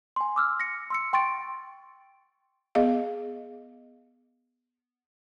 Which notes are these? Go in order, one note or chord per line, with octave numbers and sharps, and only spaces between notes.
G#5 C6
D6 E6 F6
A#6 C#7
C6 E6 C#7
G5 C6 C#6 A6 D7
B3 G#4 D#5 F5